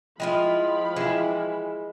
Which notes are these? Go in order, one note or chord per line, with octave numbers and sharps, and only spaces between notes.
F3 G#3 E4 F4 F5 G5 B5
E3 G#3 E4